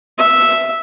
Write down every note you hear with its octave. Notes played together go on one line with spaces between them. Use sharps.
E5